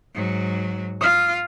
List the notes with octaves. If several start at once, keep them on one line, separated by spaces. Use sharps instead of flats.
G#2 F#3
F4 D#6 F6